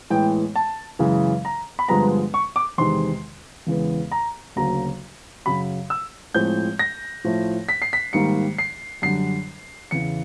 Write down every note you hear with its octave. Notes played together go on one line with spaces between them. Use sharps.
A2 E3 G#3 B3 G5
A5
F#2 C#3 E3 G#3
A#5
B5
G2 D3 F3 G#3 B3 A#5
C#6
D6
E2 C3 D#3 G#3 C6
E2 C#3 E3 G#3 B3
A#5
D2 C#3 F#3 A#3 A#5
F#2 C#3 F#3 B5
E6
A2 F3 G#3 C4 G6
A#6
A2 F3 A3
B6
C7
B6
G#2 D#3 G3 A#3 C#7
C7
F#2 D3 G3 C7
E2 C#3 E3 C#7